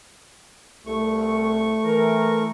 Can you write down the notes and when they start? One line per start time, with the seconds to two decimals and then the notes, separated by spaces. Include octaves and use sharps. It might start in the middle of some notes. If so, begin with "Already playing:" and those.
0.86 C2 A3 C#6
1.84 E3 A#4